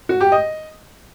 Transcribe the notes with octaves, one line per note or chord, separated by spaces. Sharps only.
F#4
G4
D#5